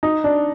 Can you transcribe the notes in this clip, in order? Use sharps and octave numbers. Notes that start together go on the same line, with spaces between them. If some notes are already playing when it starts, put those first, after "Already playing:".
D#4
D4